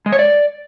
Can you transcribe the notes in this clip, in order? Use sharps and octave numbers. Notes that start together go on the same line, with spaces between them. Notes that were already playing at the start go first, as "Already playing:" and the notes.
G#3
C#5
D5